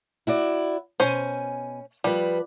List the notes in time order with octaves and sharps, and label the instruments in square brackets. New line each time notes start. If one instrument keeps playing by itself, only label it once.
[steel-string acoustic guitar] E4 F#4 D5
[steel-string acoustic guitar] B2 G#5 [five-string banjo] C#4 C5
[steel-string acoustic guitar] F3 B4 [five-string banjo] G3